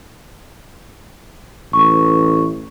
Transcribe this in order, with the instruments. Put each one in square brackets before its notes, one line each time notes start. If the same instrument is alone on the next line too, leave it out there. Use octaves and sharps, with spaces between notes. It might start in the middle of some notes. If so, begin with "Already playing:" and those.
[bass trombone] A1 [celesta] C#6